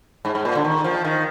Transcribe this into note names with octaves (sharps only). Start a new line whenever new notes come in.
G#2
G#2
A#2
D3
D#3
F3
D#3